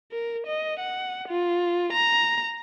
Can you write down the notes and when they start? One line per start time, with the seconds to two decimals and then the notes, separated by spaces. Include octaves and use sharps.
0.12 A#4
0.47 D#5
0.80 F#5
1.29 F4
1.93 A#5